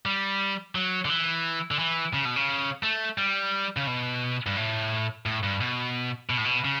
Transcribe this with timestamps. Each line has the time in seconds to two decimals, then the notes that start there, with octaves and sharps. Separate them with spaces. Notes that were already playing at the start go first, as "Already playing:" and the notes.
0.06 G3
0.75 F#3
1.05 D3
1.09 E3
1.71 D3
1.79 E3
2.14 C#3
2.25 B2
2.36 C#3
2.83 A3
3.18 G3
3.77 C#3
3.87 B2
4.46 G2
4.57 A2
5.26 A2
5.43 G2
5.60 B2
6.30 B2
6.37 A2
6.45 B2
6.65 C#3